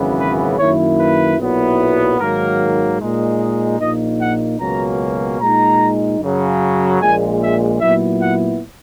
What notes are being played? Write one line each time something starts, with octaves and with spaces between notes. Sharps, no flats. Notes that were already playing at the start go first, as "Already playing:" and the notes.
Already playing: G#1 F#2 C#3 E3 B3
B4
F#2 D#3 A#3 E4 C#5
B4
B1 A#2 F#3 B3 E4
G#2 D#3 F#3 A#3 A#4
A#2 G#3 D#4
A#1 A#2 A#3 D#4 D#5
F#5
C#2 B2 F#3 A#3 C#4 A#5
A#2 G#3 D#4 A#5
F#2 C#3 F#3
A#1 A#2 G#3 G#5
E5
A#2 F#3 B3 E4 E5
F#5